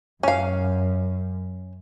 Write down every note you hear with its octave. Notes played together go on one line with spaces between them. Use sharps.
F#2 C#4 F5